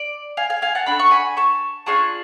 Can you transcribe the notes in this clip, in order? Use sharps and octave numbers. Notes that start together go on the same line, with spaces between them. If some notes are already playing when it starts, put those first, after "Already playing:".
Already playing: D5
F5 G#5
F5 G#5
F5 G#5
F#5 A5
D4 F#4 A4 B5
C#6
G#5 B5
A5 C#6
D4 F4 G#4 A5 C#6